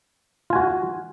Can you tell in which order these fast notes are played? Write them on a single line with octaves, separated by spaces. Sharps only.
F4 G#5 F#4